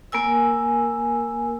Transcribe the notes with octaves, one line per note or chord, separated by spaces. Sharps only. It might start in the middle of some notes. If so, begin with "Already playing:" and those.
A#3 A#4 G#5 E6